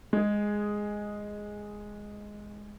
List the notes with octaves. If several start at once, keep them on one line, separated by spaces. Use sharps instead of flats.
G#3 G#4